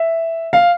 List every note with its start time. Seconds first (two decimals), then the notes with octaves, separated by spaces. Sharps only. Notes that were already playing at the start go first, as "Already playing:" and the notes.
Already playing: E5
0.53 F5